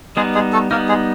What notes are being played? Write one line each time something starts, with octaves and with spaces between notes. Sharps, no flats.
G3 G#3 B3 D#4 G#4
G#3 G#4
A3 A4
G3 A#3 B3 D#4 A#4
G#3 G#4